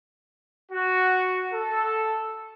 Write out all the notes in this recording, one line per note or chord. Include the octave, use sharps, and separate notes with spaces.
F#4
A4